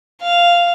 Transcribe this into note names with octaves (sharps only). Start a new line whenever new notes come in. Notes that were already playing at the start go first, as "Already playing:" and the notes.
F5